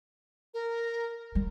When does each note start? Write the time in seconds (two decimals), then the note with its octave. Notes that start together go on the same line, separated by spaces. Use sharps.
0.54 A#4
1.35 G3